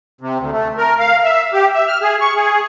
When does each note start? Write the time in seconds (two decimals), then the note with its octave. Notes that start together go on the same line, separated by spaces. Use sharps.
0.21 C3
0.38 D2
0.52 A3
0.78 A#4
0.99 F5
1.24 E5
1.53 G4
1.74 E5
1.88 F6
2.02 G#4
2.21 C#6
2.36 G#4